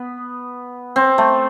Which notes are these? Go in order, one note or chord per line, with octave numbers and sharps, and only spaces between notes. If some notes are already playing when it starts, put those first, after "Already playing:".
Already playing: B3
C4
A3